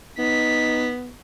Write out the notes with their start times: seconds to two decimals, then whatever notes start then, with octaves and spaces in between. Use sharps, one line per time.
0.19 B3 D#4 B6